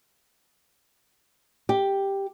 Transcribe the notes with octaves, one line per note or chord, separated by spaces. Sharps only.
G4